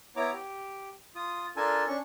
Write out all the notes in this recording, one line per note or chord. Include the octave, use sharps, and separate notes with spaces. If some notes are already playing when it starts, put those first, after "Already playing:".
B3 E4 C#5 A#5 D6
G4
F4 D#6
D4 F4 A4 A#4 G#5 A5
C#4 D4 C#6